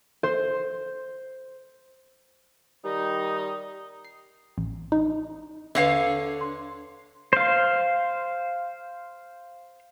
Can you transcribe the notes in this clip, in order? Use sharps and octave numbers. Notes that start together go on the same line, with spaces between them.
C5
D#3 G3 D#4
C7
A1
D#4
D#2 D3 B4 C#5 F5
C6
C5 F5